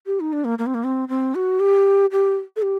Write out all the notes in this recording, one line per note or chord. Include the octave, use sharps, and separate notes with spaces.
G4
D#4
D4
A#3
A#3
C4
A#3
C4
C4
F#4
G4
G4
A4
G4